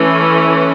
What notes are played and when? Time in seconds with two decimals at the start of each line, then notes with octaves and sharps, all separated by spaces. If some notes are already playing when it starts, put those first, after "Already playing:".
Already playing: E3 A3 C#4